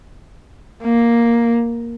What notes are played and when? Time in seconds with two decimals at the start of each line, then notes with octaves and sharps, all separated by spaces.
0.83 A#3